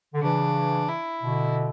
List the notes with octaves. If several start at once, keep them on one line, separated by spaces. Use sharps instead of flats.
D3
C#3 E3 D4
E4
B2 D3